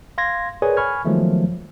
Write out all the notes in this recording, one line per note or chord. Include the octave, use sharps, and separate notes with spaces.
F5 C6 G#6 A#6
G#4 A#4 B4 C#5 D5 G#5
G#5 B5 C#6 F6 G#6
D#3 F3 F#3 G#3 A3 B3